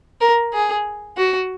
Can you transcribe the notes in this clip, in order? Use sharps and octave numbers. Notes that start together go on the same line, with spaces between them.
A#4
G#4
F#4